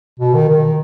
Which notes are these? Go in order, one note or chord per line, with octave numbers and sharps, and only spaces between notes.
B2
D#3
D#3